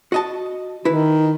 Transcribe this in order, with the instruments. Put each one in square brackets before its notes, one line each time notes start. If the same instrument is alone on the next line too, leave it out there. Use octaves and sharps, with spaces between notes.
[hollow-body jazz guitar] F#4 D#5 A5
[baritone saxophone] D#3 [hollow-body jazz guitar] E4 B4